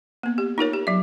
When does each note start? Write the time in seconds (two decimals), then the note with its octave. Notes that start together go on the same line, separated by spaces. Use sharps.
0.23 A#3 B3
0.38 G4
0.58 D#4 F4 A#4 C#5
0.73 G4
0.87 F#3 E5